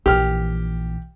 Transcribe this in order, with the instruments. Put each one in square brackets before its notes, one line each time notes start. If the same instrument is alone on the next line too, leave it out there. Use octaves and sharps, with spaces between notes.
[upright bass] A#1 E3 [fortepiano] G4 F6